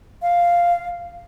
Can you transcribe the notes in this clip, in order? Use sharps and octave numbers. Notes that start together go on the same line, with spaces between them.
F5